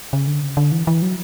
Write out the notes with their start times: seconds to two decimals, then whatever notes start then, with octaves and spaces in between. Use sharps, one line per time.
0.13 C#3
0.27 D3
0.43 C#3
0.57 D3
0.72 E3
0.87 E3
1.02 F#3